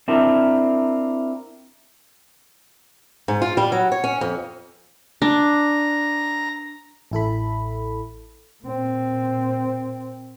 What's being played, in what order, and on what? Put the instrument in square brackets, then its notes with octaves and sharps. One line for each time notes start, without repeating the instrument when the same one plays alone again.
[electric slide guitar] C4 D4 E4 F4 A#4
[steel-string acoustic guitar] G#2
F4
G3
F#3
C#5
C#4
F2
[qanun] D4 [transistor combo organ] A#5
[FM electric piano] A1 E4 A4 B5
[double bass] A#2 C4